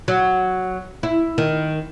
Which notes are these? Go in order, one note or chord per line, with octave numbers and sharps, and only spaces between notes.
F#3
E4
D#3